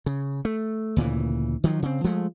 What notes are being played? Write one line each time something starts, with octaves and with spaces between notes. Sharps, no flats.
C#3
A3
D2 A#2 C#3 E3
D#3 F3 F#3
C#3 C4
F3 G#3 A3